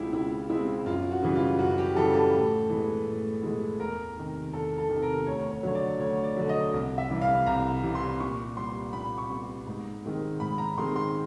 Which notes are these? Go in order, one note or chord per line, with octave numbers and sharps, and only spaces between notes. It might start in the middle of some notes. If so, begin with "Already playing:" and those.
Already playing: C#2 B2 G#3 C4 E4 F4 G4
C#2 E4
B2 G#3 C4 E4
F#2 F4
F#4
C#3 E3 G3
F4
F#2 F#4
G4
C#3 E3 G3 A4
A4
A2
E3 G#3 B3
A2
E3 G#3 B3
E2 A#4
C3 D#3
E2 A4
A4
C3 D#3
A#4
D2 C#5
C#5
D3 F#3 C#5
D5
D2 C#5
D5
D3 F#3
D#5
C2
E5
C3 E3 G3
F5
C2 A#5
C3 E3 G3
C6
A#2 C#6
G3 B3 C6
A#2 B5
C#6
G3 B3
G#2
D#3 G#3 C4
G#2 B5
A#5
D#3 G#3 C4 C6
C6